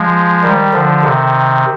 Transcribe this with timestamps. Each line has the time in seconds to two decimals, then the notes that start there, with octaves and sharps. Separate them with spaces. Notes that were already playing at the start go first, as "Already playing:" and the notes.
Already playing: F3 G#3
0.43 D#3 G3
0.73 D3 F3
1.03 C3 D#3